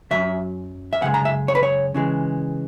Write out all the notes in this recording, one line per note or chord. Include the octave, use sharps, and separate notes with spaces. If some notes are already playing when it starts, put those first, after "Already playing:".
F#2 C#3 F#3 E5
E5
F#2 C#3 G#3 F#5
A#5
E5
C#5
B4
C#5
C#3 E3 G#3